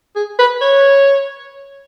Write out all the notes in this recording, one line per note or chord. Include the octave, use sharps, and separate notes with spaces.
G#4
B4
C#5